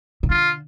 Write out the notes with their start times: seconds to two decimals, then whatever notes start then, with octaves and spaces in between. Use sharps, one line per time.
0.23 C3
0.29 D3 F4